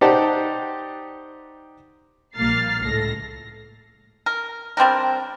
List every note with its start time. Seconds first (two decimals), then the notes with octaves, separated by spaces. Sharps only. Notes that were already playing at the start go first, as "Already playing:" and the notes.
0.01 D#4 G4 C5 D5 F#5 A5
2.36 A#1 G3 A#3 F6 A6 C7
2.84 C#2 A2 A4 A#6
4.26 A#4
4.77 G3 C4 D4 A#4